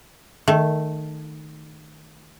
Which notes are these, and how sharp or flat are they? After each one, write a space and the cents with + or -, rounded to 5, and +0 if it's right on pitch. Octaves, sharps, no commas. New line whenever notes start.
D#3 -15 A3 +0